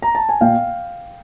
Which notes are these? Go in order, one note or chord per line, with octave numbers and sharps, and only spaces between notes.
A#5
A5
G#5
A#2 F5 G5